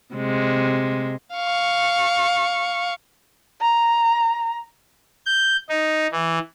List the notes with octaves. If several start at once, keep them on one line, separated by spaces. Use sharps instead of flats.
C3 G#3
F5 C#6
A#5
G6
D#4
E3